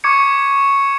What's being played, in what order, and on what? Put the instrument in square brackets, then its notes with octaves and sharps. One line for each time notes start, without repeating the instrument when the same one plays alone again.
[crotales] C#6 D6 G#6 C#7